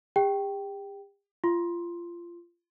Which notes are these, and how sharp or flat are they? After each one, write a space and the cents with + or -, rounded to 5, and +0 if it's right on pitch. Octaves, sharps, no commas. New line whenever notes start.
G4 +40 G5 -10
F4 -20 C6 +10